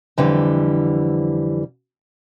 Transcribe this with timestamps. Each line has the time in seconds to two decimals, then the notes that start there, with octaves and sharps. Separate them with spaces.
0.18 F2 D3 E3 G3